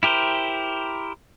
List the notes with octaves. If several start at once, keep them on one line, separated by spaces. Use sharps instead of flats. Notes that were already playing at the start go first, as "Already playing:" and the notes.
E4 G4 A#4 C5